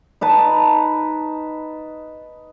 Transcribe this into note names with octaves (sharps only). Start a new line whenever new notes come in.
D#4 B4 A5